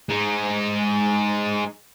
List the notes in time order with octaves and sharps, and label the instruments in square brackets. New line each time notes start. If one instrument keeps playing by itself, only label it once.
[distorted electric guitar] G#3 D#4